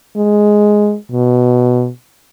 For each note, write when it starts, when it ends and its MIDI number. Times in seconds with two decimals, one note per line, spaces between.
0.16 0.96 56
1.12 1.90 47